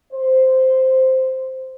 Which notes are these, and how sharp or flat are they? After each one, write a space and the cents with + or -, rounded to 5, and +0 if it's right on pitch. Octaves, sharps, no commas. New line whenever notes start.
C5 -5